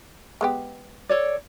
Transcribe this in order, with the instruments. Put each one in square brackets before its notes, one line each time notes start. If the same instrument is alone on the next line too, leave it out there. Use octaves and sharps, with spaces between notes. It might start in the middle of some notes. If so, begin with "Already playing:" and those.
[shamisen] G#3 B3 G4
[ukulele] A4 C#5 D5